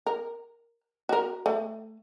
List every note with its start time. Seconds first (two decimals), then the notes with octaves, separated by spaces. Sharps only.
0.06 A#4
1.09 F#4 A#4
1.46 A3